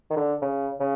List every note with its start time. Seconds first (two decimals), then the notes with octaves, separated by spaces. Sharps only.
0.10 D#3
0.16 D3
0.42 C#3
0.80 C#3